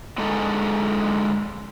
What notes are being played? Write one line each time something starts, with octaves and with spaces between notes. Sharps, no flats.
D3 G#3 D#4 G#4 A4